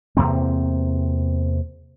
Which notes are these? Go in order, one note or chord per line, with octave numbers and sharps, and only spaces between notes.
E2 C3 A#3 C4